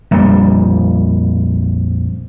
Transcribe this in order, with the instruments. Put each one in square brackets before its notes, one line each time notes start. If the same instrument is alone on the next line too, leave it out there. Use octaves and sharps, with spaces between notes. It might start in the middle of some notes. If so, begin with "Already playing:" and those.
[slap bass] A#1 F2 G3